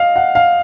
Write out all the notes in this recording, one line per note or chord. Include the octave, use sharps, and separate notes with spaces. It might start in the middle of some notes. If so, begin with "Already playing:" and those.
Already playing: D#5 F5
F#5
F5